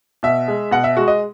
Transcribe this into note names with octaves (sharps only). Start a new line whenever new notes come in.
B2 E5
G#3
B2 F#5
E5
G#3 F#4
D#5